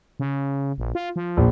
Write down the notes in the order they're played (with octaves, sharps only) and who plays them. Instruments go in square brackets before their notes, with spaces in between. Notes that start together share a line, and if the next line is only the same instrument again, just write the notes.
[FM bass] C#3
A#1
F4
F3
[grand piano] A#1